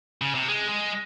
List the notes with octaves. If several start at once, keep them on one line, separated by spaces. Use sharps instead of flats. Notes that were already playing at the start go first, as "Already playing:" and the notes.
C#3
C3
G#3
G#3